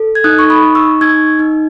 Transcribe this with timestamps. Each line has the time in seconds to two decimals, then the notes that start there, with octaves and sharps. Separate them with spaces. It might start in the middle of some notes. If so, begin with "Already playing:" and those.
Already playing: A4
0.15 G#6
0.24 D#4 D#6 F#6
0.39 C#6
0.50 B5 D#6
0.62 D#4
0.75 C#6 E6
1.01 D#4 E6 G#6
1.39 D#4